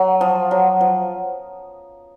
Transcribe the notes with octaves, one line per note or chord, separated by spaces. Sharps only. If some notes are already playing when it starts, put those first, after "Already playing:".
Already playing: F#3
F3
F#3
F3